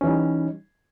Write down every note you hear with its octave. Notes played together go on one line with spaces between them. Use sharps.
E3 G3 C#4 D#4